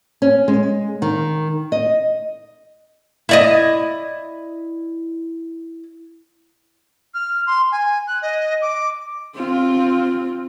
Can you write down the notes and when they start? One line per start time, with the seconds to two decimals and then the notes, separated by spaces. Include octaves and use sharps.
0.22 C#4
0.48 G#3
1.02 D#3
1.72 D#5
3.29 E4 D5 D#5
7.14 F6
7.47 C6
7.72 G#5
8.08 F#6
8.22 D#5
8.62 D6
9.35 C4 F4